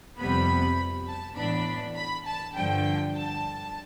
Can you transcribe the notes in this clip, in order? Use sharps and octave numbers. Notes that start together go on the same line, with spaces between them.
F2 C3 G3 B3 B5
A5
A2 E3 B3 D4 B5
B5
A5
G2 D3 F3 G5
A5